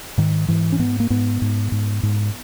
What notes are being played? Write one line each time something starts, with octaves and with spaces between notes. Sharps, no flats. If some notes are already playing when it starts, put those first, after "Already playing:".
G#2 D#3
G#2 E3
C#4
G#2 B3
A#3
G#2 B3
G#2
G#2
G#2